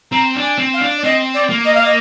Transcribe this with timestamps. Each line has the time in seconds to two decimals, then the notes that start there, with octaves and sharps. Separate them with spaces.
0.12 C4 A#5
0.35 D4
0.42 G#5
0.58 C4
0.74 F5
0.81 D4
0.98 D5
1.03 C4 D#5
1.34 D5
1.50 A#3
1.65 D#5
1.75 F5
1.85 D#5